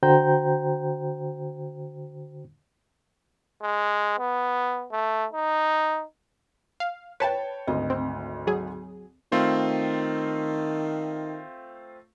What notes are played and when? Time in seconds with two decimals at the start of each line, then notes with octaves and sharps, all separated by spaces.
0.03 D3 F#4 C5 G5 A#5 G6
3.62 G#3
4.18 B3
4.92 A3
5.33 D#4
6.80 F5
7.20 B4 C#5 G5 A5
7.67 G#1 D2 D#5
7.90 C4
8.47 F#3 G#4
9.32 D#3 A3 C4 F4